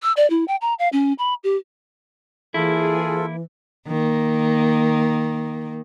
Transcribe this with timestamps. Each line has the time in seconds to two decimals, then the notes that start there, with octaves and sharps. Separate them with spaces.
0.03 E6
0.17 D5
0.30 E4
0.48 G5
0.61 A#5
0.79 F5
0.93 C#4
1.19 B5
1.44 G4
2.54 E3 A#3 E4 F4 G#4 A4
3.88 D#3 A#3